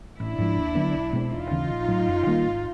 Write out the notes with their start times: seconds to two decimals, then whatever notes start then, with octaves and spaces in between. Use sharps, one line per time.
0.19 A1 D4 E4
0.38 G#2 F3 G#3
0.56 D#2
0.75 D3 F#3 B3
0.94 B1
1.13 B2 G#3 C4
1.32 E1 D#4 F4
1.51 D#2 C#3 E3
1.69 A#1
1.88 A2 F#3
2.08 F#2
2.27 D#3 G3 A#3
2.45 G#1